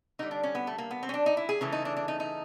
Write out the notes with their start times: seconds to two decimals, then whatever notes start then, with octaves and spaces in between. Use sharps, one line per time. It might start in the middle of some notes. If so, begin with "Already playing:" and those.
0.19 D3 G3 D#4
0.31 D4
0.43 C#4
0.55 B3
0.67 A3
0.78 A#3
0.91 B3
1.03 C4
1.09 C#4
1.14 D4
1.26 D#4
1.37 E4
1.49 G#4
1.61 C#3 E3 A3
1.72 D#4
1.85 D4
1.97 D4
2.08 D#4
2.20 D#4